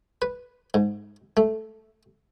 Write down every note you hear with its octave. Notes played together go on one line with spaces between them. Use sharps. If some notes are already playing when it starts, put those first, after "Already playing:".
B4
G#2
A3